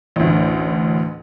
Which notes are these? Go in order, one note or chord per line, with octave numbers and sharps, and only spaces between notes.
A1 D2